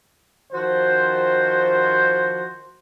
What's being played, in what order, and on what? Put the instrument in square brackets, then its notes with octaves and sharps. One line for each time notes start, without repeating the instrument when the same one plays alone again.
[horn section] D#3 F3 F#4 C5